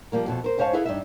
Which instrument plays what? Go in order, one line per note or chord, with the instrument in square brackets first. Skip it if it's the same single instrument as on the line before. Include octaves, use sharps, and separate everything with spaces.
[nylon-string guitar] F3 G3 A#3 A#4
F2 B2 A4
A#4 C5
G#2 C#4 C5 C#5 F5 A5
E4 G#4 A4 B4 E5 F5
G2 D#4 E5